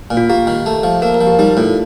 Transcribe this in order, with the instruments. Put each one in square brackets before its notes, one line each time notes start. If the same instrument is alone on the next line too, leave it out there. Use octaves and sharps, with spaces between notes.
[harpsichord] A#2
[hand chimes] F4
[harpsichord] A#3 [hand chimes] G4
[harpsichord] D#3
A3
F3
[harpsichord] A#3 [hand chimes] A#4
[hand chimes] A#4
[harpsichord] F3
[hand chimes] G4
[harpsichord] G3 [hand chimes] D#4
[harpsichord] A2 [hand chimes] F4